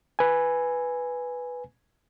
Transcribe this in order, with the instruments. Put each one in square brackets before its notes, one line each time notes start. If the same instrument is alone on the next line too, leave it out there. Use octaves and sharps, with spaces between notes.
[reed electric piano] B4 G#5